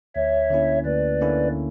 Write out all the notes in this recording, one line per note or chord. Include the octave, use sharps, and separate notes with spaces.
D2 C#5 E5
D3 A#3 C#4 E4
D2 B4 D5
D3 A#3 C#4 E4